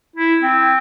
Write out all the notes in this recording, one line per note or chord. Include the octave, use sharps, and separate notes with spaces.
E4
C4